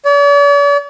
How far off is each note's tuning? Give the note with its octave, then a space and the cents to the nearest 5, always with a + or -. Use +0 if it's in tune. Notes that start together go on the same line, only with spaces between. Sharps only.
D5 -45